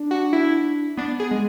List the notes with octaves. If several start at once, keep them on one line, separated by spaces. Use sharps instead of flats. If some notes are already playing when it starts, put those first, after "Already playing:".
Already playing: D4
F#4
E4
B3 D4
G#4
G#3